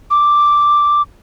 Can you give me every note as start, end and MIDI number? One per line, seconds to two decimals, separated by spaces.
0.11 1.02 86